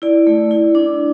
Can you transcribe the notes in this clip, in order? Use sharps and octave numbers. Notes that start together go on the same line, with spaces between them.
E4 D5
A3
E4
D4